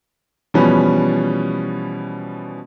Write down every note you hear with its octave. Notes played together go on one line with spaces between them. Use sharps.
B2 E3 F3 G3 C#4 B4